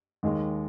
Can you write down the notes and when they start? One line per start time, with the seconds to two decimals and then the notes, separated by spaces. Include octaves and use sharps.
0.23 D#2 D#3 G#3